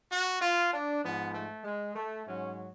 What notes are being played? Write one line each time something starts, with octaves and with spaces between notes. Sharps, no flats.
F#4
F4
D4
G#2 F3 B3
A3
G#3
A3
G#2 F#3 C#4